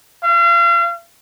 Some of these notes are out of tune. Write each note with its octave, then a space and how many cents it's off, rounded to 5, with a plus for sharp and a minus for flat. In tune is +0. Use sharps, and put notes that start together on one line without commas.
F5 -35